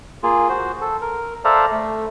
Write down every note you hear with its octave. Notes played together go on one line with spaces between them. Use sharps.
A#3 F4 G#4
F#4 C5
A4
A#4
A4 C5 D5 E5 F5 A#5
A3